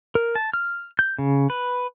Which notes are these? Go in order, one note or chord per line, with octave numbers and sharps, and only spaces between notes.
A#4
A5
F6
G6
C#3
B4